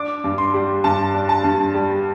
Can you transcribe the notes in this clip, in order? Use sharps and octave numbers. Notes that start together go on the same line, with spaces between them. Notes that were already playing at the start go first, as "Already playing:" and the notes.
Already playing: D4 D6
G2
C6
G3
G2 A5
D4
A5
G2
G3